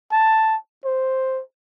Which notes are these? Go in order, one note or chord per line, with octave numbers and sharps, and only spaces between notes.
A5
C5